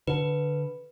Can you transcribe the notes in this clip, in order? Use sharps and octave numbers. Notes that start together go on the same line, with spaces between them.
D3 B4